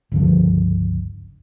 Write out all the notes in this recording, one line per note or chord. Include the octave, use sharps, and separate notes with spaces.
G1 C#2 D3 F3